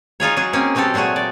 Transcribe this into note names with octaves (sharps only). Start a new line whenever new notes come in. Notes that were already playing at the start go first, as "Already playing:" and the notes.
D#4 F4 G#4 C#5
F#3 D#4 G#4
A#3 C4 C#4
B2 F#3 C4 G4 A4
A#2 F#3 A3 F#4 G#4
D5